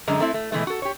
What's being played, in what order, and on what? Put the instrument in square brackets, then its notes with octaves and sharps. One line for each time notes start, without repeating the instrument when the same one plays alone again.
[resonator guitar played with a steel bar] F#2 D3 G#3 A#5
A3 C4 E4
A3
B2 E3 G#3 A3
F#4 A4
G4 C#5